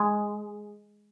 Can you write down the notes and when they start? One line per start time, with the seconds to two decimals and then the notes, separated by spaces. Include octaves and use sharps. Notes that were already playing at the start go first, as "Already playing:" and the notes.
Already playing: G#3